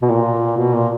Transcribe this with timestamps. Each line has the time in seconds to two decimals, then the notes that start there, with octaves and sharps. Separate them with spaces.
0.02 B2
0.10 A#2
0.57 B2
0.74 A#2